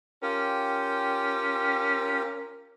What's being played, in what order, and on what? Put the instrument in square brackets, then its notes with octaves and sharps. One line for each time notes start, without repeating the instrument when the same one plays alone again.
[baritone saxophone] C#4 [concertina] F4 G4 G5 [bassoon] A#4